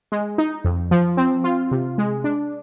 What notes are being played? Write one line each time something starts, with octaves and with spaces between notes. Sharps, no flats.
G#3
D#4
F2
F3
C4
F4
C3
G#3
D4